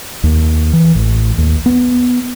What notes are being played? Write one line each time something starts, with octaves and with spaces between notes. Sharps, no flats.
D#2
E3
A1
D#2
B3